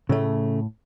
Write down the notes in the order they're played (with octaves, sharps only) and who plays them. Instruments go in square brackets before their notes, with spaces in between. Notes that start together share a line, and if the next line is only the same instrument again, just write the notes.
[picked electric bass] A2 [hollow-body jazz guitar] C#3 A3